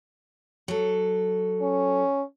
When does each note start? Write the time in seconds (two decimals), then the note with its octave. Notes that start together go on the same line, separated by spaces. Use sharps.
0.68 F#3 A4
1.61 C#4